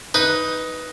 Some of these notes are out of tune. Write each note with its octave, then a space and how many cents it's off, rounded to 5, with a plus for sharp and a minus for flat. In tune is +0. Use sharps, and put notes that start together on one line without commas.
D#4 +10 B4 +0